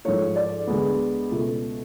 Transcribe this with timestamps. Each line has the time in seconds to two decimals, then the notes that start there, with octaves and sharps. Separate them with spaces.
0.05 G#2 F3 A3 C#5
0.36 D5
0.67 D2 D3 G#3 B3
1.31 C#2 B2 A3